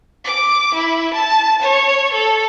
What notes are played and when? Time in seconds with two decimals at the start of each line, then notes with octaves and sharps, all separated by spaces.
0.24 D6
0.74 E4
1.13 A5
1.61 C#5
2.12 A4